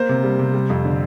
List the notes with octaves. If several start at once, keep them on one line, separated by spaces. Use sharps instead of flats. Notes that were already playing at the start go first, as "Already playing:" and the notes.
Already playing: A#3 C5
C3
G3
C3
G3
F2
D3